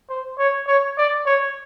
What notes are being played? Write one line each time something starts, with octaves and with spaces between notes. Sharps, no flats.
C5
C#5
C#5
D5
C#5